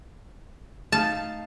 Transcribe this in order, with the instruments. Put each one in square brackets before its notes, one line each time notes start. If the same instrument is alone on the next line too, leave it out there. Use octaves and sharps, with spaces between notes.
[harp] A3 D#4 F5 [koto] A5